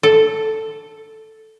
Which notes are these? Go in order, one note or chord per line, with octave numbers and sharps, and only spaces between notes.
A4